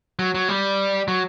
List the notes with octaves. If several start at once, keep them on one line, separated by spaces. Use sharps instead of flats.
F#3
F#3
G3
F#3